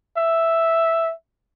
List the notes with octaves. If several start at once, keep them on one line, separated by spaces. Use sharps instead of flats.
E5